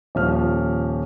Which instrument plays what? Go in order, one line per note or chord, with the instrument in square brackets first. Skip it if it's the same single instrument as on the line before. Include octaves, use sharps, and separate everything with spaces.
[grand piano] D#1 F3 F6